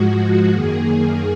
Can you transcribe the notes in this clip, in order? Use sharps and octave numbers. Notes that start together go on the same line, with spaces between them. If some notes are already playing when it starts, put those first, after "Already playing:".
Already playing: G#2 F3 G#3 F#4
F#2 D#3 A#3 G#4